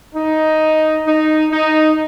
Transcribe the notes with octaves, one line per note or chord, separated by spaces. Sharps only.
D#4
D#4
D#4